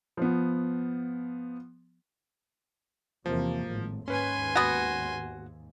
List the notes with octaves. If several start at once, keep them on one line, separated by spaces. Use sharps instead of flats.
F3 B3
E2 C3 F3 A#3
G#1 A2
D#2 G#2 C#4 B4 G#5 C6
B3 F#4